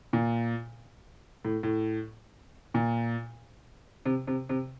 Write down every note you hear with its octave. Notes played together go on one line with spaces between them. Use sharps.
A#2
A2
A2
A#2
C3
C3
C3